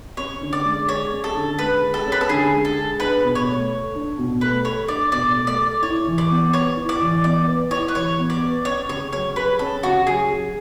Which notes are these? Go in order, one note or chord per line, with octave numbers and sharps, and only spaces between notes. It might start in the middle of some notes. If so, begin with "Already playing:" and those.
C#4 C#5
D3
D5
G#3
G#4 C#5
C#4
A4
D3
G#3 B4
G#4
A4
C#4
B4
A4
D3 G#4
G#3
A4
G#4
D4 B4
B2
C#5
A3
A4
D4
B2
A3 B4
A4 C#5
D4 D5
B2 D5
A3
D5
A4
E4 C#5
E3
D5
B3
B4 C#5
E4
D5
E3
B3 D5
B4
E4 C#5
B4
E3 C#5
B3
D5
B4
C#4 C#5
C#3 C#5
F#3 C#5
G#4 B4
C#4 A4
C#3 F#4
F#3 G#4
G#4